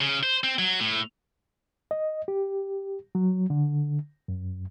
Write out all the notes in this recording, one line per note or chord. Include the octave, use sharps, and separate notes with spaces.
C#3
C5
C4
F#3
A2
D#5
G4
F#3
D3
F#2